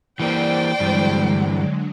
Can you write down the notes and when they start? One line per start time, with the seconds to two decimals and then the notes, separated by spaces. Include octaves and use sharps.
0.20 E3 A#3 C5 D5 F#5 G5
0.80 G2 D3 E3 F#3 G#3